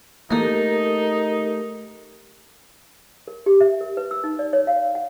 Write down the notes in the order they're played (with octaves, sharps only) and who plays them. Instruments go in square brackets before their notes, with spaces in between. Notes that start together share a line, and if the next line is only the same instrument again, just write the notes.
[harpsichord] E3 A#3 [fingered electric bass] A3 [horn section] D#4 [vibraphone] G4 A4 A#4
[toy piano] A#4
G4
E5
A#4
B4
E6
D#4
D5
C#5
F5
F#5